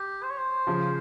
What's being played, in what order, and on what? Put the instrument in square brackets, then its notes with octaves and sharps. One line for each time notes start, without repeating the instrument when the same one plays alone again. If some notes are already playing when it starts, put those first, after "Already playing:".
Already playing: [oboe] G4
C5
C#5
C5
[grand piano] C#3 F3